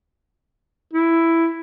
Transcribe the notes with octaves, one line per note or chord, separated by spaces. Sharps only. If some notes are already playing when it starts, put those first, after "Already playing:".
E4